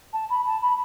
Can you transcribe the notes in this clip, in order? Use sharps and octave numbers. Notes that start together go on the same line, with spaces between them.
A5
B5
A5
B5